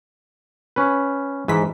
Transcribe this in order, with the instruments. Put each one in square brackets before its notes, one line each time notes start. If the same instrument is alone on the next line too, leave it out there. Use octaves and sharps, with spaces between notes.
[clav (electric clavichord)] C#4 B4
[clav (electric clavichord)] G#2 [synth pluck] E3 B6